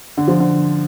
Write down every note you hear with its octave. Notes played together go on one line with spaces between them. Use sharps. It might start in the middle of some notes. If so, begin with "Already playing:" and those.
D3
F3
D3